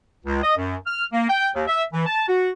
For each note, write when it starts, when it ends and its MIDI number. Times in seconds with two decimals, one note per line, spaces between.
0.25 0.42 37
0.43 0.55 75
0.56 0.76 42
0.87 1.04 89
1.12 1.28 58
1.29 1.48 79
1.54 1.63 39
1.67 1.83 76
1.92 2.04 52
2.06 2.25 81
2.28 2.49 66